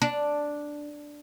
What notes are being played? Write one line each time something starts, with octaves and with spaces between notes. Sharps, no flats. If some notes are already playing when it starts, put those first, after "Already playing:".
D4